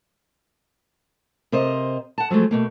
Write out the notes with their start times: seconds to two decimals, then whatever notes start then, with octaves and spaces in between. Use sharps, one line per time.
1.52 C3 A#4 C5 D#5
2.18 F#5 A5
2.30 F3 F#3 G#3 A3
2.51 B2 A3 A#3